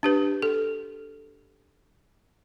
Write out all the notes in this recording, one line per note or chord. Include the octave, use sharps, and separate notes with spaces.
D4 G4 B4
A4